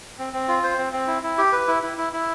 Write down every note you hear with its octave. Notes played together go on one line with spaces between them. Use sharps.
C4
C4
F4
C5
C4
C4
E4
E4
G4
B4
E4
E4
E4
E4